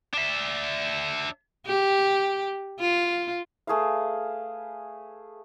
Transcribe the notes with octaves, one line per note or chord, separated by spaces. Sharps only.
D4 E5
G4
F4
A3 G#4 B4 F5